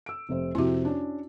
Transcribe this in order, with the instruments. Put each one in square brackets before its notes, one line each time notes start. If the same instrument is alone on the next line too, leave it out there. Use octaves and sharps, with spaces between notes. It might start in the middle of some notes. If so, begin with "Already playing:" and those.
[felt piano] E6 D7
F1 C3 C5
[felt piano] F2 C3 [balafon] E4 F#4
[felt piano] C#4 D4